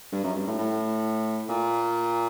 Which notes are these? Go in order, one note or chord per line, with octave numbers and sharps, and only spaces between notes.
G2
F#2
G2
A2
A2
A#2